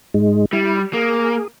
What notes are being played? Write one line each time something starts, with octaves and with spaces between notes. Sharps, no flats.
G#2 G#3
G3 E4
A#3 G#4